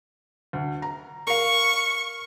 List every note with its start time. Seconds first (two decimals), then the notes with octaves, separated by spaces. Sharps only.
0.53 D2
0.82 A#5
1.27 A#4 F5 C#6